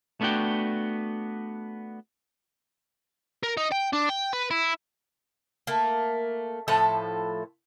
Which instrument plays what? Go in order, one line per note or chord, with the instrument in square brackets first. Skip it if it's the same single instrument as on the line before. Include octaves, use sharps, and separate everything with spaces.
[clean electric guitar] A3 B3 D4 F#4 G5
[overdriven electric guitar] A#4
D#4
G5
D4
G5
B4
E4
[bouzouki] A3 A#3
A2 F3 A4 E5